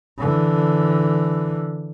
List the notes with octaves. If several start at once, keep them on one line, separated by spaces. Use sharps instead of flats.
D3 E3